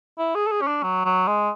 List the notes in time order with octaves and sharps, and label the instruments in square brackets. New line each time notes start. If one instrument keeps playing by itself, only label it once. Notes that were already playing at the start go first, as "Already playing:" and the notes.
[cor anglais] E4
G#4
A4
G#4
C#4
D4
F#3
F#3
G#3